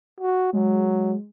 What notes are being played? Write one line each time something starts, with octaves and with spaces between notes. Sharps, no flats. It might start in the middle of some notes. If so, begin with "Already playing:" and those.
F#4
F#3 G#3